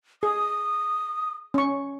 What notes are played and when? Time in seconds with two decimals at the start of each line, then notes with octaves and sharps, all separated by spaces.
0.23 G#4 D#6
1.54 C#4 C#6